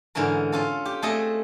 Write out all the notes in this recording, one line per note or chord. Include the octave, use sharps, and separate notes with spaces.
G#2 D3 E3 C#4 A#4
C#4 F4 A4
G4
A3 C4 G#4 A4 D#5 G5